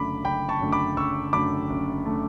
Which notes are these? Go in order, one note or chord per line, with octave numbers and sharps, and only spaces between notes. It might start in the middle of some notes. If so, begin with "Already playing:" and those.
Already playing: F#1 F#2 D3 A3 B5 D6
F#1 G5 B5
A5 C#6
F#2 D3 A3
B5 D6
F#1 C#6 E6
F#2 D3 A3 B5 D6
F#1
D3 A3